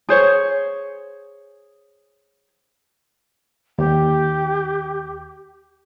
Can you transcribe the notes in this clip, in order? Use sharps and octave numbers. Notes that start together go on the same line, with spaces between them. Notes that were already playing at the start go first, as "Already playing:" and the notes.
G#4 C5 C#5
D#2 G4